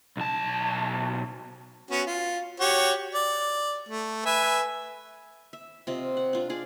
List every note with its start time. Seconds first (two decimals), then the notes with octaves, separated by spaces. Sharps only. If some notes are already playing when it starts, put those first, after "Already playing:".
0.17 B1 A5
1.91 B3 C#4 F#4
2.07 F4
2.60 F#4 G4 C#5
3.14 D5
3.89 A3
4.25 B4 E5 G#5
5.53 E5
5.87 C3 F4 D#5
6.17 F#5
6.33 D4 F4
6.50 F4 G#4 D5